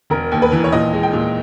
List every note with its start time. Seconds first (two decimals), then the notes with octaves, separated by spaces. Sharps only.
0.10 E1 A#4
0.32 D#2
0.42 B4
0.52 E3
0.64 C#5
0.72 A#2 D#5
0.93 G#3
1.03 G5
1.13 A#2